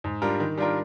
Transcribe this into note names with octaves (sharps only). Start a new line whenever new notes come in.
G#2
G3 D4 F4 A#4
D#3
G3 D4 F4 A#4